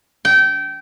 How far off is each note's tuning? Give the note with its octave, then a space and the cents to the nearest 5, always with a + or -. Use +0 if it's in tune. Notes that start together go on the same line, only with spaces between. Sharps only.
G5 -25